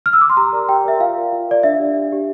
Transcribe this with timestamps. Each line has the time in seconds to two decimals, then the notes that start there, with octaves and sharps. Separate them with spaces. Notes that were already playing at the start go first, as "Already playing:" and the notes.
0.06 F6
0.13 E6
0.21 D6
0.29 C6
0.37 G4 A#5
0.53 A#4 D5
0.69 G4 G5
0.84 A#4 D5 E5
0.99 F4 F5
1.17 A#4 D5
1.32 F4
1.48 A#4 D5
1.63 D4 E5
1.79 G4 D5
1.95 D4
2.11 G4 D5